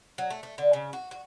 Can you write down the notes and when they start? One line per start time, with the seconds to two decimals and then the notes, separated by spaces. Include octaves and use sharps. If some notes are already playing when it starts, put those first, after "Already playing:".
0.18 F#3
0.30 A3
0.43 A3
0.58 D3
0.73 C#3
0.93 F#4
1.11 F#4